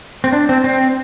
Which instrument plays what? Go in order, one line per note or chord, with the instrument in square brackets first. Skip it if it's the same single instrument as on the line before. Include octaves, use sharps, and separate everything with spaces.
[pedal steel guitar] C4
D4
C4
C4